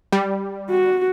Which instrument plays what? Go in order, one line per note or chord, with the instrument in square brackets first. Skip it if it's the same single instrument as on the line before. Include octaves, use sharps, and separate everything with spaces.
[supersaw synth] G3
[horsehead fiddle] F#4